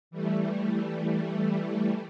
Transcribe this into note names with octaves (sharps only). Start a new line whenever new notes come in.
E3 G3 A3